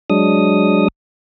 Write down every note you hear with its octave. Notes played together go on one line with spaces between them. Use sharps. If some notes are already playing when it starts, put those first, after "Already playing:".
F#3 G#3 D4 D#6